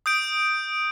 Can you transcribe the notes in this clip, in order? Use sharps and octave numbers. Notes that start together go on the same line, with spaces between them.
D#6 G6 D7